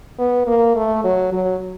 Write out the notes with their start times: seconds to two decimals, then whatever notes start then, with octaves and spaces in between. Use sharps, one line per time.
0.19 B3
0.47 A#3
0.76 A3
1.04 F#3
1.32 F#3